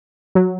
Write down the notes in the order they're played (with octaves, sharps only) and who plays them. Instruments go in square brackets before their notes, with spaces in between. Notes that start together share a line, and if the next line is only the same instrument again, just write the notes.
[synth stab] F#3